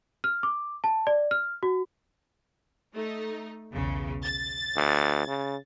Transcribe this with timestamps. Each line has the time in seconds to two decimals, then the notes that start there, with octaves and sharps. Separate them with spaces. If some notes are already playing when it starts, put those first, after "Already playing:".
0.24 F6
0.43 D6
0.84 A5
1.07 D5
1.31 F6
1.63 F#4
2.94 A3 D#4
3.73 B1 E2 C#3
4.24 A6
4.76 D2
5.27 C#3